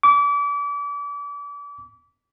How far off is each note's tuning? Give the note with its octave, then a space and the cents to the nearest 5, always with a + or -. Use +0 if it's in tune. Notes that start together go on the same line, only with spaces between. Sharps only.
D6 -35